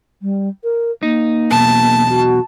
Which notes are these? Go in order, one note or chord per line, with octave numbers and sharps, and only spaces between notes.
G3
A#4
A#3 D#4
B1 E2 B2 A5
F#4